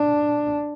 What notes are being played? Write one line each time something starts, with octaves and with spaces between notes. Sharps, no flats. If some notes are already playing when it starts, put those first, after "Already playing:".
Already playing: D4